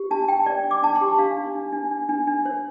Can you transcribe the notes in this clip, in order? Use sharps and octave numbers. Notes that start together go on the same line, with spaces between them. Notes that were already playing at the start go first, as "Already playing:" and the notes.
Already playing: G4
D4 A5
D4 G5
C5 D5
D4
D6
D4 A5
C6
G4
D4 F5
D4
D4
D4
D4
D4
D4
C5